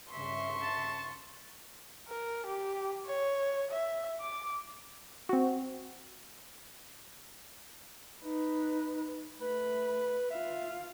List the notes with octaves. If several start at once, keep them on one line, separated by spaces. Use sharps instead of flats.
G2 C#3 E5 C6 C#6
A5
A#4
G4
C#5
E5
D6
C4 F#4
D#4 B4
A3 B4 B5
F4 E5 F5